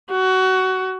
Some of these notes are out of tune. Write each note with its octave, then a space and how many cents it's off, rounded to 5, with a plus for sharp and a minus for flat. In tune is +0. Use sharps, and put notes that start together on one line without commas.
F#4 +20